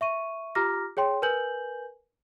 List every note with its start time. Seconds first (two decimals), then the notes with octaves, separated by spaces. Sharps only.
0.01 E5 C#6 D#7
0.55 F4 G4 A#5 D6 F6 A#6
0.97 G#4 C#5 G5 C6
1.22 A#4 B4 G#5 G6 F#7